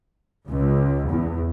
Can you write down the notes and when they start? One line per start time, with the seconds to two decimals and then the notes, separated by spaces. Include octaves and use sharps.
0.47 C#2
1.07 E2